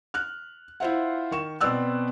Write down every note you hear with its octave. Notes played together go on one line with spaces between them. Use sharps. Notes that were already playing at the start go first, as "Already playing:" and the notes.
F6 F#6
E4 F4 C5 E5 F#5
D#3 C#6 E7
B2 B3 C4 D5 E6 F#6